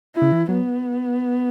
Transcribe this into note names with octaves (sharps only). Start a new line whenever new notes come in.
E4
C#3
E3
F#3 B3